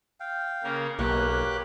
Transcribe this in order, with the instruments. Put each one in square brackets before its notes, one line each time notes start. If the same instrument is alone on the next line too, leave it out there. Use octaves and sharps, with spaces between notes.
[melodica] F5 G5
[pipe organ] C#3 A#3 A#4
[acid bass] B1 [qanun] A#3 [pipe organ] G4 F#6 [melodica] B4 C#5